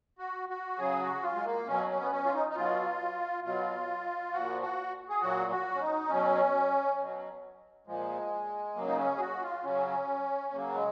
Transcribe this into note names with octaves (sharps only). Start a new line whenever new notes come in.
F#4
F#4
C#3 F#3 G#4
F#4
F4
G#3
A#3
B2 F#3 C#4
C#4
B3
C#4
F4
D#4
D#4
B2 F#3 F4
B2 F#3 F4
A#2 F3 F#4
F#4
G#4
A#2 F#3 F#4
F#4
C#4
D#4
B2 F#3 C#4
B2 F#3
A#2 F3 G#3
C#3 F#3 A#3
D#4
C#4
G#4
F#4
F4
C#3 F#3 C#4
C#3 F#3 A#3
G#3